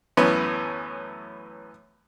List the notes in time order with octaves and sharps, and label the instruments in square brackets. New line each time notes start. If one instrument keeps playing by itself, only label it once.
[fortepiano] F#2 A2 E3 B3 C#4